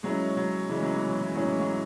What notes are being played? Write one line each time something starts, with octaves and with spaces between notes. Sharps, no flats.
F#3 G#3 C#4 E4
F#3
C#3 E3 G#3 C#4
F#3
E3
F#3
E3
A2 F#3 G#3 C#4 G#4 C#5
E3
F#3